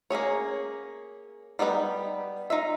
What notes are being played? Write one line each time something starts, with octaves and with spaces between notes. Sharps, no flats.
A#3 C#4 G#4 C#5
G3 B3 D#4 G#4 B4
D#4 F4 E5